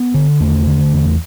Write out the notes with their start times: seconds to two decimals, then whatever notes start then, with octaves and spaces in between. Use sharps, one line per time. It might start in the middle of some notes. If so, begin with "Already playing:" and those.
Already playing: B3
0.14 D3
0.40 E2 A3
0.67 D3
0.93 E2